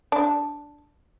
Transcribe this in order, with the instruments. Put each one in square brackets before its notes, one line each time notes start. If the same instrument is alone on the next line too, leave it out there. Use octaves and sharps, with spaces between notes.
[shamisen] D4